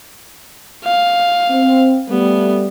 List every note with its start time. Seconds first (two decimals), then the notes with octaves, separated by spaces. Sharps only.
0.84 F5
1.50 C4
2.09 G3 A3 B3